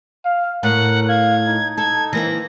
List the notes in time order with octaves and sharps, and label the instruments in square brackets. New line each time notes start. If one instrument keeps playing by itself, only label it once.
[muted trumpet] F5
[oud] A2 [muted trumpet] A#4 [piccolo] F#5
[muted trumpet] F5 [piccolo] G#6
[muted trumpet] D#4
[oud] A4 [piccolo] G#6
[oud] E3 A#3 C4 [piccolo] A#6